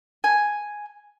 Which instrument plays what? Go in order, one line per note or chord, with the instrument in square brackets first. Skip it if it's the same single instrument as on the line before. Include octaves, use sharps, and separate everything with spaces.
[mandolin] G#5